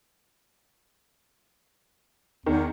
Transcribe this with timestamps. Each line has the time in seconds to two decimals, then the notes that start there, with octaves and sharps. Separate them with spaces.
2.46 E2 D#3